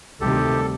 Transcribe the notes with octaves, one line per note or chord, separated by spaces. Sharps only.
D2 C3 D#3 G3 G4 A4